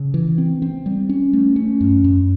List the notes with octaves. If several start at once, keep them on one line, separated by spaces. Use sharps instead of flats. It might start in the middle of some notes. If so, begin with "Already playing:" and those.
Already playing: C#3
E3
C4
C4
G3
C#4
A3
C#4
F#2
F#2